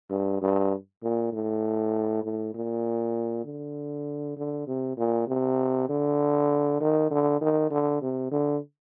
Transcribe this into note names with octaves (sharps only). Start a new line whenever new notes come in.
G2
G2
A#2
A2
A2
A#2
D3
D3
C3
A#2
C3
D3
D#3
D3
D#3
D3
C3
D3